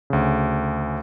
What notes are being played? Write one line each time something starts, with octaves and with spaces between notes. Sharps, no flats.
D2 C#3